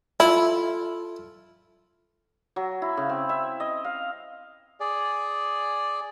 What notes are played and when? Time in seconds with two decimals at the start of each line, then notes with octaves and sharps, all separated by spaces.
0.20 E4 F4 A4
2.56 F#3
2.82 E4
2.97 C#3
3.09 C4
3.29 E5
3.60 D#5
3.84 F5
4.80 G#4 D5